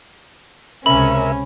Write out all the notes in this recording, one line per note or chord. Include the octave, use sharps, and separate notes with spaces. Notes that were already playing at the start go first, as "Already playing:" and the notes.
C#2 C3 C#4 A#4 E5 B5